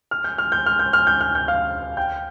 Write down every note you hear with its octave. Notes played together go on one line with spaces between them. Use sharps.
F6
G6
F6
G6
F6
G6
F6
G6
F6
G6
F5 F6
G5 G6